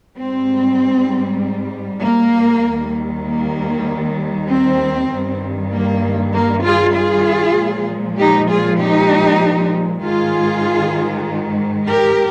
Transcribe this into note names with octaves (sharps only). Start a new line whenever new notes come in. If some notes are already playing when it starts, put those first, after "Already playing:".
G#2 G3 C4
A#3
D#2 D#3 G3
A#3
C4
G2 D#3 G3
A#3
A#3
F4 G#4
F4 G#4
A#2 F3 G#3
D#4 G4
F4 G#4
D#4 G4
G#2 D#3 G#3 F4 G#4
G4 A#4